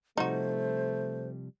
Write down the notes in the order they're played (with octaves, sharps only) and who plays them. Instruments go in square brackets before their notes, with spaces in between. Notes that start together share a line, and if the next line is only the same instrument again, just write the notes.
[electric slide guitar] C3 F3 G3 [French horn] A3 [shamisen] D#4 F#4 [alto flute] C5